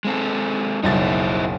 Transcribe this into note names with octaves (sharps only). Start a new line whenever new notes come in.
G#3 C4 A4
F#1 B1 D#4 E4 C5 A6